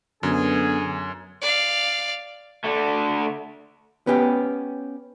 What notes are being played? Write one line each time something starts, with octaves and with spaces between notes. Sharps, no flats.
F#2 D3 B3 G#4
D5 F5
D3 A3
B3 C#4 G4